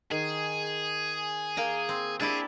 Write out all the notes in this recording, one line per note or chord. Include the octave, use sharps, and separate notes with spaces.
D#3 G#4
A#3 G5 A#5
C4
D4 E4 G4 G#4